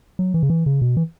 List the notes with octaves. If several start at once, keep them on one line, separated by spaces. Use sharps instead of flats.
F#3
E3
C#3
E3
C#3
B2
E3